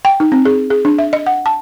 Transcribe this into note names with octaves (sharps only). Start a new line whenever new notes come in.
G5
D#4
C4
G#4
G#4
D4
E5
D#5
F#5
A5